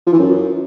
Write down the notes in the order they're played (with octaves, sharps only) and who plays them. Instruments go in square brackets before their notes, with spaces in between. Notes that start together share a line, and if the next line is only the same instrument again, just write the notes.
[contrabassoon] F3
E3
F#2